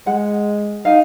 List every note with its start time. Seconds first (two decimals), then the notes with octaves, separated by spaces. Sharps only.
0.06 G#3 F#5
0.85 D#4 F5